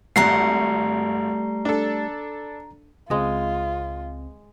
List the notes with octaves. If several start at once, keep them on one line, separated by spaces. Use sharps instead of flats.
G#1 G3 A3 F#5 A#5 F#6 C7
D4 A4
C#2 G#3 C4 F4 D#5